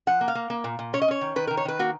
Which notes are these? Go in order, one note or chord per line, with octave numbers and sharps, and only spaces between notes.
F3 F#5
A#3
F5
A#3
A#3
A#2
A#2
C#4 C#5
D#5
C#4 C#5
D#3
D#3 B4
D#3 A#4
C#5
D#3 B4
A#3 F#4